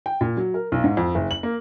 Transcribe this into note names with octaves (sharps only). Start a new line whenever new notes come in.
G5
A#2
F#3
A#4
B1
G#2
F2
F#1
F#7
A#3